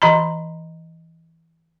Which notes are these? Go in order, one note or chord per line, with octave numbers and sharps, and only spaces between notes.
E3 D#5 A#5 B5